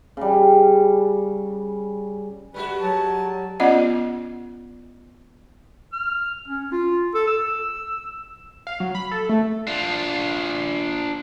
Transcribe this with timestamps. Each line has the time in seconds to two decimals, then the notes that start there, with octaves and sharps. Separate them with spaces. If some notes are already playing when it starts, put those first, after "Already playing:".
0.17 C#3 G3
2.54 G3 G#3 F#4 B4
2.81 F#3 A5
3.60 B3 C#4 F4 D5 D#5 F#5
5.93 F6
6.48 C#4
6.72 F4
7.14 A4
7.27 E6
8.67 F5
8.80 F#3
8.95 B5
9.12 A4
9.29 A3
9.68 D4 F4